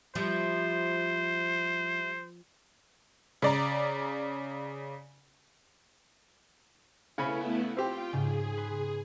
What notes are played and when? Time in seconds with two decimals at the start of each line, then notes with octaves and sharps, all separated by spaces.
0.15 F3 G3 E4 C5
3.42 C#3 D5 A#5
7.18 C#3 A3 B3 C#4 E4 B5
7.77 C4 F4 G4 G5
8.13 G#2 C#3 G#4
8.57 B4 C6